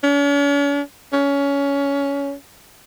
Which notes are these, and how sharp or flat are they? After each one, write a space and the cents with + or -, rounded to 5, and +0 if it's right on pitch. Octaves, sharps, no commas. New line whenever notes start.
C#4 +45
C#4 +20